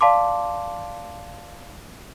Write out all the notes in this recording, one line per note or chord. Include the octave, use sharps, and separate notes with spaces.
D5 F5 A5 C6 D6